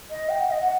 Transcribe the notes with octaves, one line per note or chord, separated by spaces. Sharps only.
D#5
G5
F#5
D#5
F#5